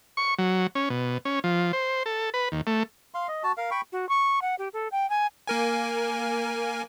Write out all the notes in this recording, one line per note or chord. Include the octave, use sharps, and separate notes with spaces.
C#6
F#3
C#4
B2
C#4
F3
C5
A4
B4
D#2
A3
F5 C6
D#5
F#4 A5
A#4 F5
G5 B5 C#6
F#4
C#6
F#5
G4
A4
G5
G#5
A#3 A#4 G#5